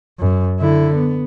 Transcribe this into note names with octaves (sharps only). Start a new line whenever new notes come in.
F#2
D3 E4
B3